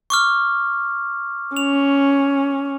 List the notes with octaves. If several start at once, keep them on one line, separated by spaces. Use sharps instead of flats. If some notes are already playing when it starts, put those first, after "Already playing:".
C#6 D6 F6
C#4 F7